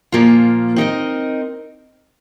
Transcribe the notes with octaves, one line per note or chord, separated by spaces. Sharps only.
A#2 F3 A#3 F4
C4 D#4 A#4 D#5